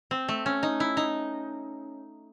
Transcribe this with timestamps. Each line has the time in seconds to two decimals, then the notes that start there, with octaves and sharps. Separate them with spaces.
0.11 C4
0.28 A3
0.46 C#4
0.63 D#4
0.80 E4
0.97 D#4